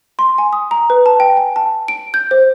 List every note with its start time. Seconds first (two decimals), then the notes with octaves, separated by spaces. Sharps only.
0.19 C6
0.38 G#5
0.53 D#6
0.71 A#5
0.90 B4
1.06 A5
1.20 G5
1.37 G#5
1.56 A5
1.88 D7
2.14 G6
2.31 C5